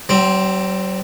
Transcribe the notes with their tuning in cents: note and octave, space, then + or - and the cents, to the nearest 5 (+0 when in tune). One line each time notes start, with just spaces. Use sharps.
F#3 +45 C4 +0